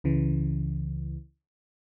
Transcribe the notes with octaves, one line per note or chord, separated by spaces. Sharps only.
C#2 C#3 E3